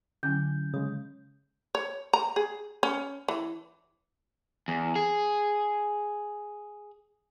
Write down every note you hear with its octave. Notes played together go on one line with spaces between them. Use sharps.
D3 F#3 C#4 E4 G#5 G6
C#3 G#3 D#6
C#5
A#5
G#4
C#4
E3
E2
G#4